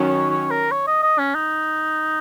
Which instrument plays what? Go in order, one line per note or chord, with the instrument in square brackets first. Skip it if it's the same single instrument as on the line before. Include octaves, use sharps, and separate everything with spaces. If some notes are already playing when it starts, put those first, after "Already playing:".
Already playing: [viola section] D#3 F#3 C#4
[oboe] C#5
C#5
A#4
C#5
D#5
D#5
C#4
D#4